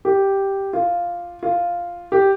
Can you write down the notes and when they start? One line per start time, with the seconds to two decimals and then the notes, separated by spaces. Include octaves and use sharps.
0.05 G4
0.73 F4
1.43 F4
2.12 G4